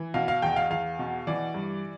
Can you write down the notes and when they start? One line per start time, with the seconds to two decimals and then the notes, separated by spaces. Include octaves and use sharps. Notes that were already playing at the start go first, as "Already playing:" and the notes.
Already playing: E3
0.14 B2 F5
0.28 F5
0.42 E2 G5
0.56 F5
0.70 E2 F5
0.99 B2
1.27 E3 D5
1.54 G2